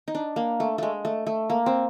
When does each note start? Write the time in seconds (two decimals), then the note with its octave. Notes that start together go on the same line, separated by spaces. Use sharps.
0.08 D#4
0.15 D4
0.36 A#3
0.60 A3
0.78 G#3 A3
1.05 A3
1.27 A3
1.50 A#3
1.66 C4